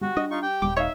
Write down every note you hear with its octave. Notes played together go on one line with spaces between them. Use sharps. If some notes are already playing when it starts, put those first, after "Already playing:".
G3 F#4
D4 D#5
D#4 F4 C#6
G4 G5
D#1 G3 D6
D#4 C#5 E5 F5